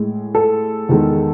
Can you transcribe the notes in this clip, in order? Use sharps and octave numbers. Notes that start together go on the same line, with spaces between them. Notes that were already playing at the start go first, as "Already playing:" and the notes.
Already playing: A2 G#3
A4
E2 D#3 G#3